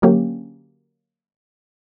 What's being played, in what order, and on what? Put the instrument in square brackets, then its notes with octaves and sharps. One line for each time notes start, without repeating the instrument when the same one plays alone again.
[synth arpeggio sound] D3 F#3 A#3 C#4 G4